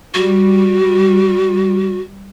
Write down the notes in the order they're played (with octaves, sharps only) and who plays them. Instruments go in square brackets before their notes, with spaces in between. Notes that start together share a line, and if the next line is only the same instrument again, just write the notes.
[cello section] G3 [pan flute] F#4